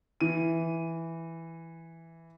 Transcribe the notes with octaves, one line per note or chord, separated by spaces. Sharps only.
E3 D#7